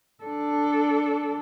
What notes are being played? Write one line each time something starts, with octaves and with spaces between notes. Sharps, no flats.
D4 A4